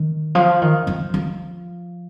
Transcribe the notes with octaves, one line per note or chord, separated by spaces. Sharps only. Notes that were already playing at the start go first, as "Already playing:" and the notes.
Already playing: D#3
F3
D#3
F3
F3